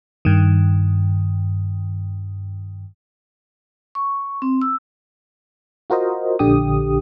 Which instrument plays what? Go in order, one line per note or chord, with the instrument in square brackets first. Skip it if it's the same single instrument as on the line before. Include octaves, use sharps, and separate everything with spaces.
[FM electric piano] G2 D#3
[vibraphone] C#6
C4
E6
[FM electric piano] F4 F#4 A#4 C5 D#5
A#1 D3 G4 D#6